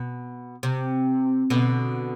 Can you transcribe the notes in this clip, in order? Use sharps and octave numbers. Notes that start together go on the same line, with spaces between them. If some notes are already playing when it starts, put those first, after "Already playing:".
Already playing: B2
C3
B2 D3